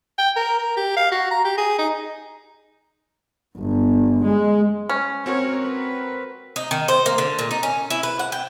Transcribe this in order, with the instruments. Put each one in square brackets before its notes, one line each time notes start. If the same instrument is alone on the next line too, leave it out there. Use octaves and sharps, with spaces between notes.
[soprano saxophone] G5
A#4
A#4
G4
F5
F#4
A#5
G4
G#4
D#4
[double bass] G1
G#3
[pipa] C#4
[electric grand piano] C4 F#4 A#4 [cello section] C#5
[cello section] B4
[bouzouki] D#4
D#3
C5
A#3
D3
A#2
D#4
C#4
E4
B4
F#5
G5